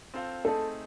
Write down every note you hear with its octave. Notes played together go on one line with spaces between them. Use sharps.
C4 F4 A4 C5 F5
A3 C4 D#4 G#4 A4